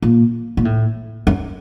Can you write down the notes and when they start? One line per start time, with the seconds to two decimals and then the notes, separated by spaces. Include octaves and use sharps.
0.02 A#2
0.57 A#2
0.65 A2
1.27 F#2